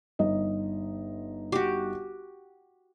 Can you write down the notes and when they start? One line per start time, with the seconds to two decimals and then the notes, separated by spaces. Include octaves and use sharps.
0.19 G1 D#4 D#5
1.52 F#4 G4